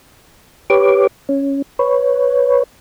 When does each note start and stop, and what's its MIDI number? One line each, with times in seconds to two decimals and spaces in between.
0.70 1.07 67
0.70 1.07 71
0.70 1.07 73
0.70 1.07 86
1.29 1.62 61
1.79 2.63 71
1.79 2.63 73